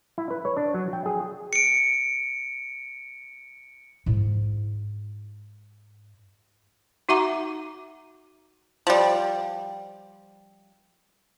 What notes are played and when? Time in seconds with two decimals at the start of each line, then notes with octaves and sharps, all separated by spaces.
0.18 E4
0.30 B4
0.45 C#5
0.57 D4
0.74 F#3
0.93 G5
1.06 G#4
1.53 C#7 D7
4.06 G#2 E4
7.09 D#4 F#4 E5 F#5 A#5 D6
8.87 F3 G3